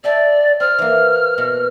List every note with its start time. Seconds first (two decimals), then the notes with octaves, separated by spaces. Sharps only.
0.04 D5 E5 G5 A5
0.60 C4 F6
0.79 E3 A#3
1.38 B2